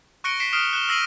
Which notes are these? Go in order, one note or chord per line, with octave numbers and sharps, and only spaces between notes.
C#6 F#6 A#6 C#7 D7 G7
B6 C7 D7 E7
D#6 F6 C7 D7 E7 G7
F#6 E7 G7
E6 A#6 C7 D#7 F#7